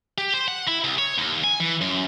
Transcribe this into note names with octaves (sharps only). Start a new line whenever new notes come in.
G4
C5
F#5
E4
C2
C#5
D#2
G#5
E3
F#2